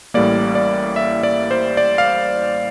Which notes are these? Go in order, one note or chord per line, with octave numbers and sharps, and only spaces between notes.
A1 A2 G3 A#3 D5
D5
E5
D5
C5
D5
F5